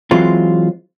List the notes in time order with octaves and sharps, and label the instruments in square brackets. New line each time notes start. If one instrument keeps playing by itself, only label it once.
[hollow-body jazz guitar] E3 F#3 G#3 C4 F4